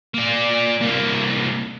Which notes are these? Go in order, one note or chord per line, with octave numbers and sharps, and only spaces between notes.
A#3 D5
C2 A#3